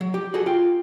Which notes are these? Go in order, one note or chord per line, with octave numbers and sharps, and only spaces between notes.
F#3
G4
F#4 G#4 A4
F4 G5